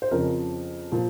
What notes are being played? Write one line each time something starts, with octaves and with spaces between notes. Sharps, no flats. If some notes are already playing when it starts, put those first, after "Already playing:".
C5
F2 C#3 F3 A#4
A#2 F3